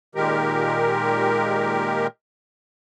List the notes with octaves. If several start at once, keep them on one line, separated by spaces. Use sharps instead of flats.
A#2 D#3 G#3 G4 A#4